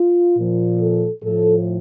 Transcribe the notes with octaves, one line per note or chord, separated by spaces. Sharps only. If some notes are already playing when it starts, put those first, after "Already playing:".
Already playing: F4
A#2 F3
A4
A2 F3 A4